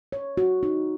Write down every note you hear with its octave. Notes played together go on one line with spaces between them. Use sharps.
C#5
F#4
D#4